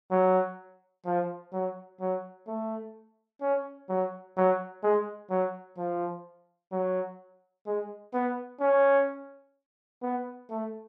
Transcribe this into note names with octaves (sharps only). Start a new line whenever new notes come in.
F#3
F3
F#3
F#3
A3
C#4
F#3
F#3
G#3
F#3
F3
F#3
G#3
B3
C#4
B3
A3